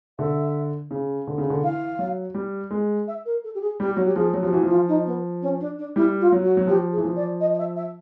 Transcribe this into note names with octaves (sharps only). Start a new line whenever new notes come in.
D3 E5
C#3
D3
C#3
D3
E3 F5
F#3
G3
G#3
E5
A#4
A4
G4
G#4
G3 G4
F#3 F#4
G4
F3 G#4
F#3
F3 G4
E3 F#4
F3
F4
D#4
B3
C#4
D4
D4
G3 E4
F4
F#3
F#4
F#3
F3 G4
G#4
E3
F3
D5
D#5
D#5
E5
E5